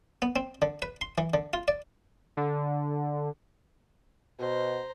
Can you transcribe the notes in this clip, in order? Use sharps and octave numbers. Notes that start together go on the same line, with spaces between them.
B3
C4
D3
B4
C6
E3
D3
F4
D5
D3
B2 C5 A#5